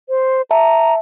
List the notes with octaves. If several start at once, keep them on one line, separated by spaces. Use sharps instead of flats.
C5
E5 A5 A#5